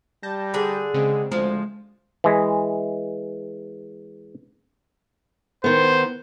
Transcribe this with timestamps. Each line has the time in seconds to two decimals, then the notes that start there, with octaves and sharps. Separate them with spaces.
0.23 G3 A5 G6 A#6
0.54 D3 G#4
0.94 C#3 G#3 C4
1.32 D2 F3 G#3
2.24 E3 G#3
5.64 D#3 B3 C5